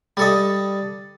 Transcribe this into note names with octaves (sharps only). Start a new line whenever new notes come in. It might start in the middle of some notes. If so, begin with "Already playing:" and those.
G3 A4 D#5